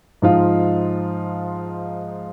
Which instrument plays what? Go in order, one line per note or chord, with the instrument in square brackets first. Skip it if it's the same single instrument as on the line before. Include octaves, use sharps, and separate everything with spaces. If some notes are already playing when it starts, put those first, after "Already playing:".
[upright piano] G#2 F3 D#4 F4